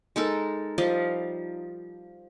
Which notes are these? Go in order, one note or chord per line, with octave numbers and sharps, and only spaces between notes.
G#3 D#4 A4 A#4
F3 G3 D#5 F5